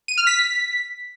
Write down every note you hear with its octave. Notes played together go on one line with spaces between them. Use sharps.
D#7
F6
B6